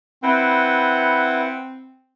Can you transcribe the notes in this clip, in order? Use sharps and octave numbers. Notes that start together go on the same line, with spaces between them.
C4 E4 B4 F#5